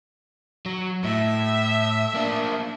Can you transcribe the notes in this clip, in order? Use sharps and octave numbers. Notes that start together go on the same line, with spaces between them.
F#3
A2 E5
A#3 D4